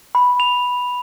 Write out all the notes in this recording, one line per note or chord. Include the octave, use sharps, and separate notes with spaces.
B5
F7